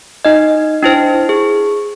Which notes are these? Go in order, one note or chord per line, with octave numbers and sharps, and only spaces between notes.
D#4 D#5
D4 E4 C5
G#4